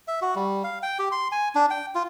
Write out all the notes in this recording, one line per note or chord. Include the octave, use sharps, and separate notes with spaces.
E5
F#4
G3
F5
G5
G4
C6
G#5
D4
G5
F4